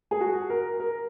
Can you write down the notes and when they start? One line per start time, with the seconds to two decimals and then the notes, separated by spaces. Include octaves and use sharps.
0.11 G#4
0.21 F#4
0.50 A#4
0.80 A#4